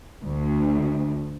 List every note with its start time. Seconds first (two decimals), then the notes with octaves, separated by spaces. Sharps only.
0.24 D2